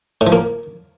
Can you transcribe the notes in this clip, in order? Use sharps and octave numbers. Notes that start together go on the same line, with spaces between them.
A2
F3
A#3